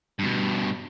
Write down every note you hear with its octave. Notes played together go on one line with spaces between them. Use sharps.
G2 B2